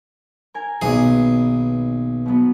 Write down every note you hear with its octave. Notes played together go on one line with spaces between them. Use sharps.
A#4 G#5
B1 D#3 A#3 B3 G#4
B2 F#3 B3